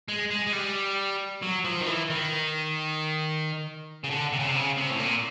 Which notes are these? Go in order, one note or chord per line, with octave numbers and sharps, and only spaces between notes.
G#3
G#3
G#3
G3
F#3
F3
D#3
E3
D#3
C#3
D3
C3
C#3
C3
C#3
C3
A2
A#2